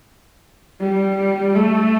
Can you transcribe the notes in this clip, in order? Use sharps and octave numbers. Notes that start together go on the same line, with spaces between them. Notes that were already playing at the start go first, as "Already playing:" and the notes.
G3
A3